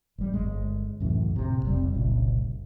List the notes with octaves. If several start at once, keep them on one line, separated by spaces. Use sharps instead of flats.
G#1 G3
G1 G#3
C#2 F#2 A2 E3
A#1 C3
F1 C#2 G3 C4
F#1 C2 A#2 C#3